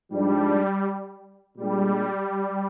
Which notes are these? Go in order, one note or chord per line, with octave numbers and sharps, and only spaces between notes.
G#2 F3 G3 G#3 D4
A#2 G3 G#3 D4